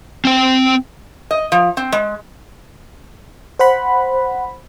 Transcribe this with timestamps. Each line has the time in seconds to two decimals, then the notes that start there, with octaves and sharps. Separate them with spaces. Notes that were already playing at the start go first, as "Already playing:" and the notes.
0.25 C4 G5
1.31 D#5
1.52 F3
1.77 C4
1.92 G#3
3.59 C5 F#5 B5